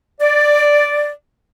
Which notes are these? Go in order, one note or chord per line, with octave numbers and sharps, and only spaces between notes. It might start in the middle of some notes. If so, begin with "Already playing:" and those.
D5